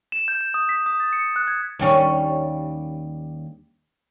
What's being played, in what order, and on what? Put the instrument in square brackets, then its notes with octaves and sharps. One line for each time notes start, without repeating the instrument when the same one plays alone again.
[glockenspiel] E7
G6
G6
D#6
B6
D#6
A6
C#7
F#6
G#6
[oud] D#2 G3 C#4